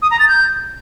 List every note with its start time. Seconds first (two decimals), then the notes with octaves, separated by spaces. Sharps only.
0.02 D#6
0.11 A#5
0.19 A6
0.28 G6